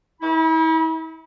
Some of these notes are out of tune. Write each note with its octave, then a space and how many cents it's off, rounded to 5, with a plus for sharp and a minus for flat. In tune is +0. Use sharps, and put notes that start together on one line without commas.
E4 -40 B5 -15